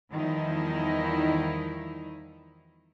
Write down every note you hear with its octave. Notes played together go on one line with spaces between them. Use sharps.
E2 D#3 F3 G3 D#4 E4